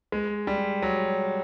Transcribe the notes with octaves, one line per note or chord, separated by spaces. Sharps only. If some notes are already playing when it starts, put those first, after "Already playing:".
G#3
G3
F#3